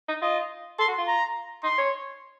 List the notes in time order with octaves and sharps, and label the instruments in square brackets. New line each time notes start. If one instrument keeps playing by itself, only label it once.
[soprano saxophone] D#4
[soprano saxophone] F4 [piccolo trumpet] D#5
[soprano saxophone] A4 [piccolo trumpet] C6
[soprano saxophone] F#4
F4
[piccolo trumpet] A#5
[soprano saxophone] D#4 [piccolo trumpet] C6
[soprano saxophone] C#5